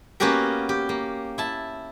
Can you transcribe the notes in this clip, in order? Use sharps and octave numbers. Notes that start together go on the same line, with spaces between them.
A#3 B3 C#4 F#4 G4 A#4
G4
A#3
E4 A5